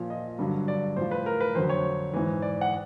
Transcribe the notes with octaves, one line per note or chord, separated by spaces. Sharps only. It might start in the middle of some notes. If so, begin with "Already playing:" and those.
Already playing: A#2 F3
D#5
G2 D3 F#3
D5
A2 F3 C5
B4
A#4
B4
F2 D3 F#3 C5
C#5
G#2 E3
D5
F#5